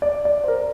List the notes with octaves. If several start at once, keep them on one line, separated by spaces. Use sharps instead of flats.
D5
D5
C5
A#4